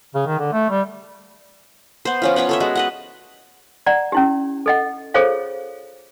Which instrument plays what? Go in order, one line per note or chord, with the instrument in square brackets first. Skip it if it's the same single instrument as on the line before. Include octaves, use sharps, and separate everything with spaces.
[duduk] C#3
D#3
D3
A3
G3
[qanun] B3 C5
F3 C#4 F4
B3 C#4 F4 C#5
A4 C#5 E5
G#3 F#4 E5
B4 D#5 F#5
[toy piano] D5 F#5 A#5
C#4 E4 G4
A4 D#5 F#5
F4 G#4 A4 C5 C#5 F5